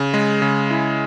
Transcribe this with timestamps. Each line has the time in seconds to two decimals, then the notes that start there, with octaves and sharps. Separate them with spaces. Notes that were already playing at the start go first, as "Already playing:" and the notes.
Already playing: C#3
0.14 G#3
0.42 C#3
0.71 E4